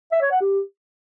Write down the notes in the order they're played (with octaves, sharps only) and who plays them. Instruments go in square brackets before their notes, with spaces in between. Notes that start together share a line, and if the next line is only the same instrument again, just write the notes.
[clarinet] E5
C#5
F#5
G4